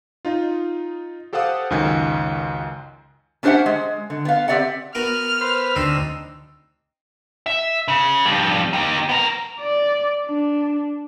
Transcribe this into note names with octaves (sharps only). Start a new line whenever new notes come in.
D#4 F4
G4 A4 C5 F5 F#5 D#6
C#2 F#2 D#3 G#5
C#4 D4 G4 C5 E5 F#5
G#3
D3
B3 F5
C4 G4 D5 E5 F#5
B3 F#4 A#4 F6
B4 C5
D2 C4 D#4 E6
E5
C#3
F2 G3
D#4 G4
B3 A#4
D5
D4